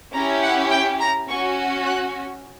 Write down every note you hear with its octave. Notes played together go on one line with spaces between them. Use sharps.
C#4 E4 G4 A#5
F#5
G5
A#5
C#4 F#4 C#6
F#6